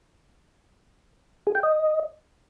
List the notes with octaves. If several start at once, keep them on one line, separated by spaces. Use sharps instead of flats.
G#4
G5
D#5